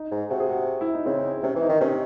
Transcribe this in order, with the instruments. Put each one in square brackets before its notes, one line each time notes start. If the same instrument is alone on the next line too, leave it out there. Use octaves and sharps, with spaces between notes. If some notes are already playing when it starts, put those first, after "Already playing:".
Already playing: [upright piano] D#4
[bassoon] G#2
[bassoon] C3 [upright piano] F#4
[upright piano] G#4
F#4
E4
D#4
[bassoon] C#3 [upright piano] C4
[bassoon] C3 [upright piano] C#4
[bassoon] E3
[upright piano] D#4
[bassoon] D#3
[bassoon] C3 [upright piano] C#4